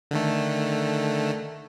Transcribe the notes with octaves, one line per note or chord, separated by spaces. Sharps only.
D3 D#3 A3